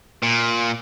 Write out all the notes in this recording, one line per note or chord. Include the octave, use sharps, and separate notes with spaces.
A#2